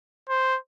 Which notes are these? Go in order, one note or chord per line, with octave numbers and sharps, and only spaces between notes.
C5